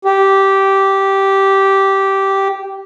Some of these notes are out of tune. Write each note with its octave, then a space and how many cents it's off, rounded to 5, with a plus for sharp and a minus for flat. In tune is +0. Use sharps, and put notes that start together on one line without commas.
G4 -10